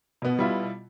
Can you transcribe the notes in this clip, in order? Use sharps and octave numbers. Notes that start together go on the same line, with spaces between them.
B2 B3
G3 E4 F4